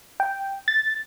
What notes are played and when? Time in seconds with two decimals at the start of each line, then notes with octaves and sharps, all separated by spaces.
0.20 G5
0.68 A6